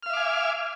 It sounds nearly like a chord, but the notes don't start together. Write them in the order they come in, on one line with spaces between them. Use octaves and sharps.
F6 F5 E5 D6 G#5